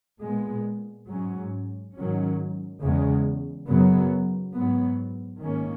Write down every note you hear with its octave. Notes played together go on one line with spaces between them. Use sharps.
A#2 G#3 B3
G#2 F#3 C#4
G#2 D#3 F#3 C#4
E2 C#3 G#3
F#2 C#3 F#3 B3
G#2 F#3 B3
G#2 D#3 A#3 C#4